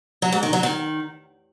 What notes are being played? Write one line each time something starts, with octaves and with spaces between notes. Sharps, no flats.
F#3
G#2
D#3
F#3
D#3